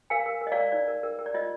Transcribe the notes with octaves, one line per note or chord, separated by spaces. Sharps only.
A#4 F5 G#5
A#4
A#4
D#5
D5 F5
A#4
D#4 D5
A#4
A#4
A#4
D5
F4 D#5